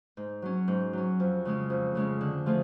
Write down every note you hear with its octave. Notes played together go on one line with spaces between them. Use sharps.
G#2
F#3 C#4
G#2
F#3 C#4
F2
C#3 G#3 C#4
F2
C#3 G#3 C#4
D3
F3 A3 F4 G#4